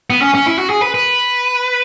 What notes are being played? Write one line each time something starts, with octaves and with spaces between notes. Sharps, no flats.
B3
C#4
C#4
E4
F#4
G#4
B4
B4